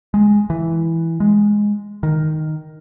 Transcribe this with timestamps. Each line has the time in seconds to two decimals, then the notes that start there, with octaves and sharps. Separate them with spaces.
0.14 G#3
0.50 E3
1.20 G#3
2.03 D#3